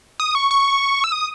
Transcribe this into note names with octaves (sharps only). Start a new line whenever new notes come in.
D#6
C#6
C#6
E6
D#6